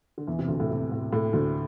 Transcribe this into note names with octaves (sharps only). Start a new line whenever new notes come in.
D3
E2 E3
C3
D2 D3
A2
C3
A2
A2
D2 D3